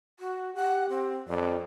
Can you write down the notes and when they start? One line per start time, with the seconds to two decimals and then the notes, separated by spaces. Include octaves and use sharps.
0.20 F#4
0.55 G4 F#5
0.89 C4
1.28 F2 D5